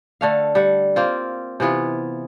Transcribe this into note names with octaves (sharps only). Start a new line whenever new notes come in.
D3 A3 F5
G3 F#5
A#3 C4 F4
C3 E3 B3 F4